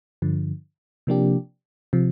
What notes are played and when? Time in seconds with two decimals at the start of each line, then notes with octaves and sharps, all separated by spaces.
0.22 G2 D3 F3
1.07 C3 F3 A#3 D4 G4
1.93 C3 F3